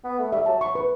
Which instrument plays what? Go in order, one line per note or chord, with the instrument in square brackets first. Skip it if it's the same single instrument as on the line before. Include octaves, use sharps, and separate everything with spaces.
[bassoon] B3
A3
[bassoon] G3 [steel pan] E5
[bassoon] F#3 [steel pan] A5
[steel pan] C#6
B4